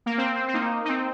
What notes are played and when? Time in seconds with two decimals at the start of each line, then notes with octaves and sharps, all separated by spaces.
0.06 A#3
0.18 C4
0.36 C4
0.48 C4
0.54 A#3 D#4
0.85 D#4
0.89 C4